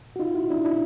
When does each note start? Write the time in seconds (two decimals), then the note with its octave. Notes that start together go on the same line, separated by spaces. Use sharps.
0.16 F#4
0.19 D#4 F4
0.35 E4 F#4
0.50 D4 E4
0.65 D4 E4